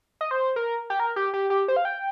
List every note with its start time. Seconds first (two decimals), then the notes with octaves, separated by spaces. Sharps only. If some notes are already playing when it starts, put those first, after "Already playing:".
0.21 D#5
0.31 C5
0.56 A#4
0.90 G4
1.00 A#4
1.16 G4
1.34 G4
1.50 G4
1.68 C5
1.76 F5
1.85 G5